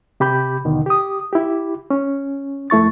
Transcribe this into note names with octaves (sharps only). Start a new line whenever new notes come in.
C3 G4 B5 G6
D#2 B2 D3 D#3
G4 D#6
E4 G4
C#4
F2 A3 E4 C#6 A6